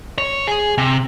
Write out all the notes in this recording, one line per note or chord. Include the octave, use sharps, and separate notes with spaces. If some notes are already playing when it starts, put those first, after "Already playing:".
C#5
G#4
C3